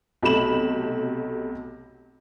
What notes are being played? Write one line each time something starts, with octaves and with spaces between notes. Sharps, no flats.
B1 C3 A3 B5 E7 F#7